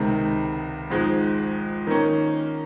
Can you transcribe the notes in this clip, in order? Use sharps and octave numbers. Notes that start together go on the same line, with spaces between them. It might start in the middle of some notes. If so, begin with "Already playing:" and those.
Already playing: C#2 C3 D#3
G#1 G#2 F3 G#3
D#3 A#3 C#4